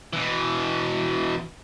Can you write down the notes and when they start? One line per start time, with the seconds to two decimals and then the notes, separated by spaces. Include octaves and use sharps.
0.13 B2 E3